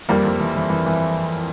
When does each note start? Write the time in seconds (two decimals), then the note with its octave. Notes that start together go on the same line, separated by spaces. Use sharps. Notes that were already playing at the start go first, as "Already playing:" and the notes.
0.09 F2 G3 A#3
0.25 F2
0.40 E3
0.55 E3
0.70 E3
0.86 E3